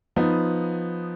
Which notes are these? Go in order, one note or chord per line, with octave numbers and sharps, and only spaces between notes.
F3 B3 D#4